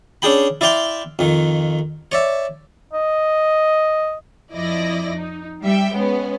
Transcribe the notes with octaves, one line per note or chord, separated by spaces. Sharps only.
C#4 D4 G#4 G5 B5
E4 D5 E5 F5 G5 C6
F2 D#3
C#5 D5 E5
D#5
F2 F3 E4 D5 D#5 A#6
D#4
G3 E5 G5
G#3 B3 C#4